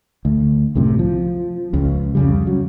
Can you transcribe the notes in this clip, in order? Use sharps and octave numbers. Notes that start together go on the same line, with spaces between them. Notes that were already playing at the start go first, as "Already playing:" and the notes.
D2
C2 F#2 A2 C3
F3
C#2 C#3
F2 C#3 G3
F#3